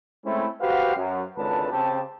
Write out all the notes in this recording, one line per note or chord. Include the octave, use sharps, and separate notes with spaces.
G#3 A3 C4 C#4 E4
F#4 G4 B4 C5 F5 F#5
F#2
G#1 C#2 D3 B4 A5
C#3 C4 G4 A5